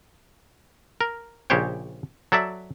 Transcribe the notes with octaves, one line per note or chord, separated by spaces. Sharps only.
A#4
A#1 C#3 G4 C5 C#5 G5
F#3 A4 D5 E5